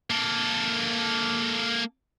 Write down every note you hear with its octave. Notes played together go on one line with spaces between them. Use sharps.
A#3 A4